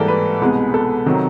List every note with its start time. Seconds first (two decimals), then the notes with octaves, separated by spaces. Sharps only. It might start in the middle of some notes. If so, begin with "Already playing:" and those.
Already playing: G#2 E3 G3 A#3 A4 A#4
0.08 B4
0.41 C2 B2 G#3
0.74 A4
1.06 C3 D#3 F#3